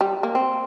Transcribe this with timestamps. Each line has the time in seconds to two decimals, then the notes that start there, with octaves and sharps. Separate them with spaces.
0.01 G3
0.23 A#3
0.35 C4